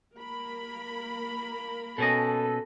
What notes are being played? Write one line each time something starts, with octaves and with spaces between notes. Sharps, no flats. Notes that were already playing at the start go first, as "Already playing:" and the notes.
A#3 A#4 B5
B2 C#4 A4 D#5